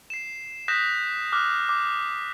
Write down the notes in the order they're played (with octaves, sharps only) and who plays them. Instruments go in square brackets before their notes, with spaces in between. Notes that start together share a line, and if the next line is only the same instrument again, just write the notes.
[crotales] C7 E7
D#6 F#6 G6 A#6 B6 E7
D6 F6 F#6
D6